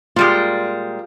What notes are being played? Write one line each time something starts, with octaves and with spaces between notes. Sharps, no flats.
A#2 G3 G#3 F4